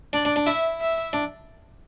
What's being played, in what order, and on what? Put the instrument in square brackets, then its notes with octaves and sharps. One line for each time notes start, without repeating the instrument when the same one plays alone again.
[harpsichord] D4 [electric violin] D5
[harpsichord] D4
D4
[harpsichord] E4 [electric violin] E5
[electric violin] E5
[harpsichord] D4